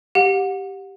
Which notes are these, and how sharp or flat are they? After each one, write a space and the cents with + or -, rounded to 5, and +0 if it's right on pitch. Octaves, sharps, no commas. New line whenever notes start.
G4 +0 F#5 -30